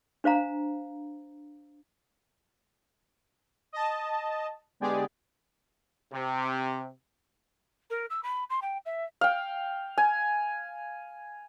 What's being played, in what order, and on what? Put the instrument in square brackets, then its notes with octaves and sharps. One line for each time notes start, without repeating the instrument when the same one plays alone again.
[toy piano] D4 C5 F5 A#5
[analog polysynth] D#5 A5
D3 G#3 B3 G4 G#4 D5
[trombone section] C3
[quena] A#4
E6
B5
C6
G5
E5
[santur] F5 G5
G#5